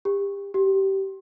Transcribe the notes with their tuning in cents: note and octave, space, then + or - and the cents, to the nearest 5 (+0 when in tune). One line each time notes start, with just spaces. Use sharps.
G4 +30
G4 -20